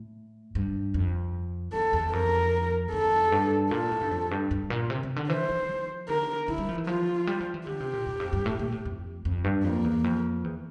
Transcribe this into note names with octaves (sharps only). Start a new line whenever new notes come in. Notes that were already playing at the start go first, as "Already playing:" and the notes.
Already playing: A2
G2
F2
F2 A4
E2
F2 A#4
F2 A4
G2
A#2 A4
A2
G2
F2
G2
G2
A#2
C3
C3
D3
E3 C5
F3
F3
D3 A#4
D3 E4
G3
F3
E3
F3 F4
G3
F3
E3
D3 G4
C3
A#2
E2
F2
G2
A2
A#2
A2
F2
F2
G2
F2 A#3
E2
F2
E2